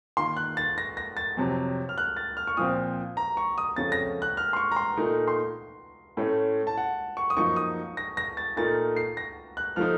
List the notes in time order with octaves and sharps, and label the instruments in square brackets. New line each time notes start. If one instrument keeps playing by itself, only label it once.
[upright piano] D#3 A#3 F4 A#4 [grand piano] C6
[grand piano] F#6
A6
A#6
A#6
A6
[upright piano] F2 C3 F#3
[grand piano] F6
F#6
A6
F6
C#6
[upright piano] A#2 F3 C4 [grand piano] D#6
[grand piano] A#5
C#6
D#6
[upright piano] F2 C#3 A3 C#4 [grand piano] A6
[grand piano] A#6
F#6
F6
C6
C#6
A#5
C6
[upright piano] A#2 A3 D#4 A#4
[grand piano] C6
[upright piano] A2 A3 C#4
[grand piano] A5
F#5
C#6
D#6
[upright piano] F#2 F3 A#3 D#4 [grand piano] C#6
[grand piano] D#6
A#6
A#6
A6
[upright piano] A#2 A3 D#4 A#4 [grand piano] A6
[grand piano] C7
A#6
F#6
[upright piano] F3 A3 D#4 [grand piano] F6